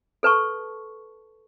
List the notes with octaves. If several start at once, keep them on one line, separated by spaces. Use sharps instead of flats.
A4 B4 A5 C#6